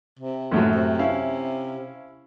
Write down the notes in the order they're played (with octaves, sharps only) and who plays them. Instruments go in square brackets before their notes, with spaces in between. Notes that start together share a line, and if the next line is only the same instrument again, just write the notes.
[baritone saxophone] C3
[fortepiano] F#2 A2 F#3
[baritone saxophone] C3
[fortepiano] C#4 E4 F5